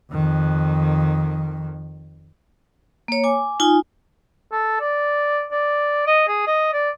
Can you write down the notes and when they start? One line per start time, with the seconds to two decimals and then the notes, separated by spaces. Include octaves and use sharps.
0.12 F2 D#3
3.08 A#3 C#5
3.24 G#5 D6
3.60 D#4 F4 G#5
4.52 A4
4.80 D5
5.52 D5
6.07 D#5
6.28 G#4
6.47 D#5
6.73 D5